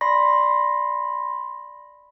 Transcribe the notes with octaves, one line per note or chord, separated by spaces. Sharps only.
D5 B5 C6 A#6